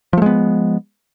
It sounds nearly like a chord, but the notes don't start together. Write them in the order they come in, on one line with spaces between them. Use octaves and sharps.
F3 A3 G#3 B3